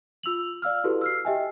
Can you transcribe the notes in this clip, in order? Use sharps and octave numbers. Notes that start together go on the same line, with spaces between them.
F4 E6 F7 F#7
D5 F5 E6 F6
E4 F#4 G4 A4 B4
E6 F6 C7
G4 D#5 E5 G5 G#5